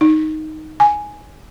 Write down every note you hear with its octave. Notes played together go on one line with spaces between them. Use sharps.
D#4
G#5